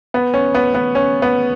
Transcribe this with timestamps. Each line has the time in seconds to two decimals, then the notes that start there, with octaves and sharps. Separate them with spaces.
0.14 B3
0.34 C#4
0.55 B3
0.75 B3
0.95 C#4
1.22 B3